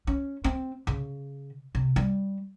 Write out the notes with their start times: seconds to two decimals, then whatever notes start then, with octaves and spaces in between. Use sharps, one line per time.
0.07 C#4
0.44 C4
0.87 C#3
1.75 C3
1.96 G3